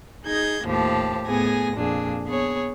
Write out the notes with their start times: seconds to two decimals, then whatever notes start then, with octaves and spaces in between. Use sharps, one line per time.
0.25 D#4 G#4 G6 G#6 A#6
0.65 D#2 A2 F3 G4 A5
1.26 A2 B3 G#4 G#5 A#6
1.76 F2 A#2 D4 G#4
2.28 B3 G#4 C#5